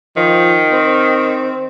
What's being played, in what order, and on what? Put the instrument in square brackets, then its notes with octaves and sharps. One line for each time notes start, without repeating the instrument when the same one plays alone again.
[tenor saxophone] D#3 [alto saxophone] F3
[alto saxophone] C4